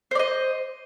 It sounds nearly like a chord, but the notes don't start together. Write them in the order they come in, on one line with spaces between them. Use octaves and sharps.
C5 D5 D#5